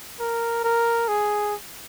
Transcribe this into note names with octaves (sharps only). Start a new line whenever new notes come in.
A#4
A#4
G#4